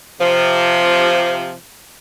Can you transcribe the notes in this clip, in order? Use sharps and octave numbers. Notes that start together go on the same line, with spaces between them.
C3 F3